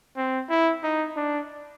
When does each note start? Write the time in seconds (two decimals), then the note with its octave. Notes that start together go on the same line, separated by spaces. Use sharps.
0.17 C4
0.49 E4
0.83 D#4
1.16 D4